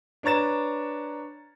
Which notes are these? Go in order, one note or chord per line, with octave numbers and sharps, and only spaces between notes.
D4 B4 C#5 A#5 A6 E7